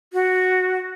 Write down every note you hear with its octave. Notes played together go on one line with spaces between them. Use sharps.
F#4